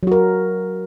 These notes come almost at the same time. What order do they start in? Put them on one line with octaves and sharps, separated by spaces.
F#3 F#4 A#4